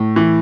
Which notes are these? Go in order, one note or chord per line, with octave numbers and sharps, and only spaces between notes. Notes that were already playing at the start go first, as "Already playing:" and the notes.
Already playing: A2
E3